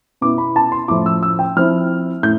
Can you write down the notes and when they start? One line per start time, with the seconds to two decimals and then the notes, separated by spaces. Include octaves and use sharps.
0.21 B2 B3 E4 D6
0.38 B5
0.56 A5
0.72 C6
0.88 A2 F3 A3 E4 D6
1.06 E6
1.23 E6
1.39 G5
1.56 F3 C4 E4 F6
2.23 A2 G6